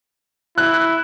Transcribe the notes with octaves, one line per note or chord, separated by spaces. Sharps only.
E4 F#6